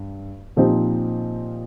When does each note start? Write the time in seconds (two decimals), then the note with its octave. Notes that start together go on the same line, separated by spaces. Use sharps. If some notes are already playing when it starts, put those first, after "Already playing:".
Already playing: G2
0.57 A#2 F3 C4 D#4 G4